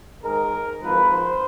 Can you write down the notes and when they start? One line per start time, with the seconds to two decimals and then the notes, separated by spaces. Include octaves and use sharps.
0.23 G#2 D#3 G#3 A#4
0.80 G#1 G#2 F3 B4
1.09 C5